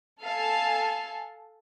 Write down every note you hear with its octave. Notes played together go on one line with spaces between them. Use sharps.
A4 F5 G#5 A5